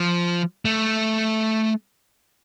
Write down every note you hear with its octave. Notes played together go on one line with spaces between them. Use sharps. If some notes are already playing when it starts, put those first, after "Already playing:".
Already playing: F3
A3